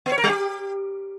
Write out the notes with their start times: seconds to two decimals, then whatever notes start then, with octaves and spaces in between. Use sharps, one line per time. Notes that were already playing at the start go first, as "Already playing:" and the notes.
0.06 B3
0.12 C#5
0.18 A#4
0.24 G3
0.29 G4